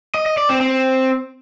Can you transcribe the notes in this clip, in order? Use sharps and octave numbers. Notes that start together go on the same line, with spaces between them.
D#5
D#5
D5
C4
C4